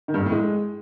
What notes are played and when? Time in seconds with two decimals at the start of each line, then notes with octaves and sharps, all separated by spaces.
0.08 D#3
0.14 G2
0.20 F2
0.26 A2
0.32 G#3